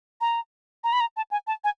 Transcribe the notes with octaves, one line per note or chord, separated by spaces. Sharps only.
A#5
A#5
B5
A#5
A5
G#5
A5
G#5